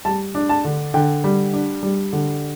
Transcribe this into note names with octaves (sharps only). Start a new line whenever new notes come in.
G3 A5
D4
A5
D3
D3 G5
G3
D4
G3
D3